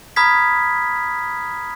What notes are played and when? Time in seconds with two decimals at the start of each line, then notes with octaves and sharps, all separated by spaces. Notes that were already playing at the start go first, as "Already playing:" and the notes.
0.16 A#5 B5 D#6 F6 G#6 B6